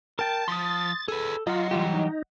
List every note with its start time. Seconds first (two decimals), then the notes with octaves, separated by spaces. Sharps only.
0.19 A#4 G5 A5 A6
0.48 F3 C6 D#6
1.08 G#4 A4 B4
1.47 F#3 F4 D#5 F#5
1.71 E3 G3 F4 G4
1.94 D#4